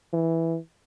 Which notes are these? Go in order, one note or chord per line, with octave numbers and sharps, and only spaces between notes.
E3